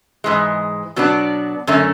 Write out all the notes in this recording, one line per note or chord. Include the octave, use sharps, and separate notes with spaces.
G#2 E3 G#3
B2 F#3 B3 D4
F#2 D3 A3 C#4